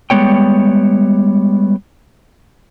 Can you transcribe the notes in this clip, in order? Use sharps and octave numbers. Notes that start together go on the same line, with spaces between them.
G3 G#3 B3 C#5 G5